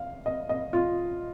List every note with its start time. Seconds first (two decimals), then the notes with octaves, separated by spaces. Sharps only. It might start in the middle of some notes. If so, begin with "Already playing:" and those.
Already playing: F5
0.26 D#5
0.49 D#5
0.73 F4